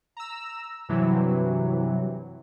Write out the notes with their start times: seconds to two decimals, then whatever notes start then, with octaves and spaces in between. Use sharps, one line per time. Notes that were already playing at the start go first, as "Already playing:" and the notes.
0.17 A#5 E6
0.89 G2 C3 E3 F#3